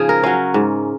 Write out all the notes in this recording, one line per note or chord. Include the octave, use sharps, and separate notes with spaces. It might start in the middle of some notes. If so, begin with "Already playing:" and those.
Already playing: G#2 C#3 F3 F4 G#4
A#4
F#3 C#4 F5
G#2